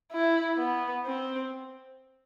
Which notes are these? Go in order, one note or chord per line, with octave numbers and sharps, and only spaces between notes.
E4
B3
C4